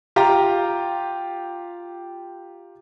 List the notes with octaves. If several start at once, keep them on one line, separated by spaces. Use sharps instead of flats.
F4 G4 A#5